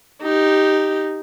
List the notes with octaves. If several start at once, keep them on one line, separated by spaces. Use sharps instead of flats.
D#4 G4